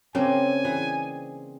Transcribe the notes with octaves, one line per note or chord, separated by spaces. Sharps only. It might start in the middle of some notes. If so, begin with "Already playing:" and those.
C#3 A#3 C4 D4 G#5
E3 G#4